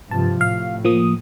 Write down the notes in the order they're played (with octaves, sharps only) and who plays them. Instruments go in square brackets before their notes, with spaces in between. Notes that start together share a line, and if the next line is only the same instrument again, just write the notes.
[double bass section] G2 C3 F3 [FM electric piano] A5
[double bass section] A2 [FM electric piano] F5
[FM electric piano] F3 A#3 D#6